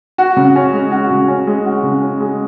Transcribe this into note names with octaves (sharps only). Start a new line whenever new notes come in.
F#4
C#3
C#4
G#3
F#4
C#3
C#4
G#3
F#4
C#3
C#4
G#3